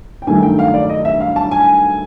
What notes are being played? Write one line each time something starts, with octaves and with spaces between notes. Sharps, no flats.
G5
G2 D#3 F#3 A3 G#5
G5
F5
D5
D#5
E5
F5
A5
G#5